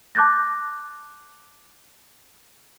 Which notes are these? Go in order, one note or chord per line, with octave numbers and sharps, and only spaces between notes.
A5 D6 F#6 G6 A6 A#6